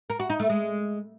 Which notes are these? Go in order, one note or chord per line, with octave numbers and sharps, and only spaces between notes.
A#4
F#4
D#4
A3
G#3